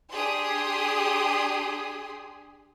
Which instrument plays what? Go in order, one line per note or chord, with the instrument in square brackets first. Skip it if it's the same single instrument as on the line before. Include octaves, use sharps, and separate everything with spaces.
[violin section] D4 G4 G#4 C6 D#6